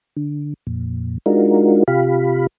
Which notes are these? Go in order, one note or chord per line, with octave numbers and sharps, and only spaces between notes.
D3
F2 A#2
G#3 D4 D#4 F4 F#4 A#4
C3 F4 G4 F5 B5